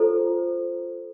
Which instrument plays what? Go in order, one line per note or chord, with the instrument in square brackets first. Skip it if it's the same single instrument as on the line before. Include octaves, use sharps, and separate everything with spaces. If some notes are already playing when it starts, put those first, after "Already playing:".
Already playing: [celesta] F4 A4 C5